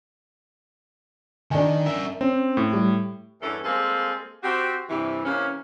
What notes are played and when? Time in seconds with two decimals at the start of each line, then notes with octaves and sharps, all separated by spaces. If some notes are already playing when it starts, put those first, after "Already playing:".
1.51 D#3 D4 G#5
1.86 A#4 E5
2.21 C4 C#4
2.57 A2
2.73 G3 G4
3.42 E2 G2 E3 C#4 A4
3.64 G3 G#3 A#3 C4 G#4 A4
4.43 C4 F#4 G4
4.89 G2 C3 E3
5.25 C3 E3 A#3 C#4